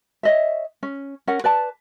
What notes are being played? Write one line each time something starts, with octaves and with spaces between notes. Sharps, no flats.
C#5 D#5 E5
C#4
C#4 A#4 F#5
B4 D5 A5